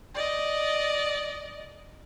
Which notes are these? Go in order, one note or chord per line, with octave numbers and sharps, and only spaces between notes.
D5 D#5